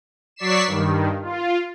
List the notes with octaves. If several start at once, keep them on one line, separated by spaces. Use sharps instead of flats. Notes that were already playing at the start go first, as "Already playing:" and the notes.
F#3 D5 C#6 B6 C7 E7
G2 D#3
F4